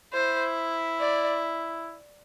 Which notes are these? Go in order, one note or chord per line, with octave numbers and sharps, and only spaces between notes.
E4 C5
D5